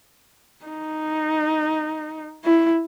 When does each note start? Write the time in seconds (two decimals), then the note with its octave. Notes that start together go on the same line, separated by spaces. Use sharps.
0.66 D#4
2.45 E4